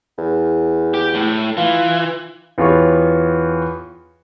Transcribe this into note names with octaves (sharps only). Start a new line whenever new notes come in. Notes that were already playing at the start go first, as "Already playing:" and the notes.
E2
G4
A2
E3 F4
E2 B3 F4 G4 C#5 C#6